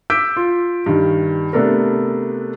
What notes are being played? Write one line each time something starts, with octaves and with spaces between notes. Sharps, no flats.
D6 E6 G6 B6 D7
F4
G2 D#3
C3 A3 B3 D4 A4 A#4